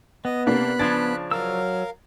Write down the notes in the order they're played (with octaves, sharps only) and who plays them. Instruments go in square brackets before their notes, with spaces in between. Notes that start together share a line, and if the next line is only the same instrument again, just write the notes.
[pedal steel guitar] B3 [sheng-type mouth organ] D#5
[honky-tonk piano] C3 A#3 D4 [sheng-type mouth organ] B5 F#6
[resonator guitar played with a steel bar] C#3 F3 D4 [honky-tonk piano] G#6 A6
[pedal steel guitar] F#3 E6 [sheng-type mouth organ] A#4 F5